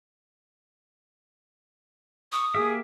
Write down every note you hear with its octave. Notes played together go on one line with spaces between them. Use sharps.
C#6 D#6
A#3 G4 G#4 E5